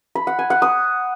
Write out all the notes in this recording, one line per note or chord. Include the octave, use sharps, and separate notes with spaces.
B5
F#5
G#5
F#5
D#6